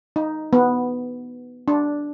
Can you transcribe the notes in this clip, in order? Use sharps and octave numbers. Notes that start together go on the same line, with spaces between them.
D#4
B3
D4